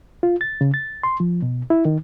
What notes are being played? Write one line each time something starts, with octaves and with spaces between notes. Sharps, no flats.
F4
A6
C#3
A6
C6
F3
B2
E4
D#3